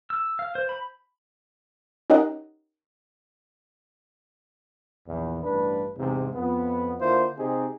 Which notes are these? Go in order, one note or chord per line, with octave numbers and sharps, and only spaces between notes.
E6
F5
C5
B5
C#4 D#4 G4 A#4 D#5 F#5
A#1 E2
A1 G2 D4 B4
E2 G#2 C3
F2 B3
D3 A#3 E4 F4 C5
C3 C4 D#4 G4 G#4